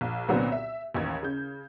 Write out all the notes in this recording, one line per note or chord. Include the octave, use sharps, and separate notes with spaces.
A#1
C2 A#2 D3 F#3 B3 C4
E5
A1 D#2 G#6
C#3 G6